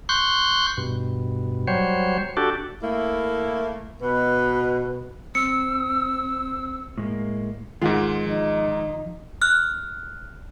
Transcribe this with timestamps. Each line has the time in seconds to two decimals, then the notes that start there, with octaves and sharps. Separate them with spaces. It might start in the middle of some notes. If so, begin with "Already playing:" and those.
0.09 C6 C#6 F#6 G6
0.77 G2 B2
1.68 F#3 G3 C5 C#5
2.37 D4 F#4 G4 A4
2.82 A3 A#3 E4
4.01 B2 B4
5.35 C4 E6 C#7
6.98 A2 G#3 A#3
7.82 G#2 D#3 G#3 F4 F#5
8.24 F3 D#4
9.42 F6 F#6